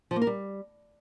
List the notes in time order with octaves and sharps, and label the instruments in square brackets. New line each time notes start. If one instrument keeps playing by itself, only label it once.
[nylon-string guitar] F3
A#3
A#4
G3